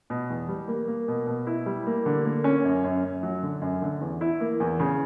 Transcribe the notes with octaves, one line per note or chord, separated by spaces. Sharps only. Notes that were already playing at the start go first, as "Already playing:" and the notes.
B2
E2
G3
A#3
A#3
B2
B2
E4
G3
A#3
D3
A#3
C#4
F#2
F#2
F#2
F#3
D3
F#2
D3
E2
E4
A#3
E2
C#3